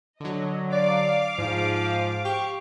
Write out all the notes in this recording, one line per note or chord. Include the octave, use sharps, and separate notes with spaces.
D3 F#3 D#5
D5 F5 D6
G#2 F3
G4 C#6